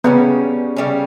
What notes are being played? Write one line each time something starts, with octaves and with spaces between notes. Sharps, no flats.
C#3 G3 B3 C#4
C#3 G3 C#4